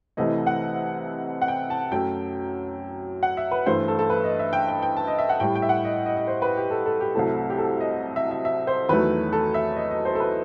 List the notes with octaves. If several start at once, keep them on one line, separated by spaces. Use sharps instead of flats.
C2 C3 E3 A3 D#5
F#5
F#5
G5
A5
F#2 F#3 A3 G5
F#5
E5
B4
G2 E3 A3 C5
A4
A4
B4
D#5
E5
G5
G5
G5
A5
D#5
E5
F#5
A2 G3 G5
G5
E5
F#5
D#5
D#5
D#5
C5
B4
G4
A4
A4
G4
C2 C3 F#3 A3 A4
G4
A4
D#5
E5
E5
E5
C5
E2 D#3 F#3 A3 B4
A4
E5
D#5
D#5
C5
A4
B4